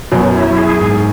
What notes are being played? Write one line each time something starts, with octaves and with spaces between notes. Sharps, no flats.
F#2 B2 F#3
E4
G#4
G#2